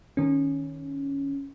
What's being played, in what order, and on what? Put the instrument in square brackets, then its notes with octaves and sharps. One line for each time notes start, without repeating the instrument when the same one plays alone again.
[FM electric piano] D#3 C#4